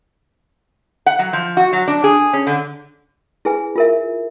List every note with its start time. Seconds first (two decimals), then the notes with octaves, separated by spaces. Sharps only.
1.06 F#5
1.19 F#3
1.33 F3
1.57 F#4
1.73 F#3
1.88 D4
2.04 G#4
2.33 C#4
2.47 D3
3.45 E4 G#4 B4 G#5
3.76 F4 A#4 E5